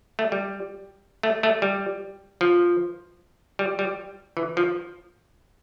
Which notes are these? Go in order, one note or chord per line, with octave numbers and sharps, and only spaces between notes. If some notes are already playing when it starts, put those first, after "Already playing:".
A3
G3
A3
A3
G3
F3
G3
G3
E3
F3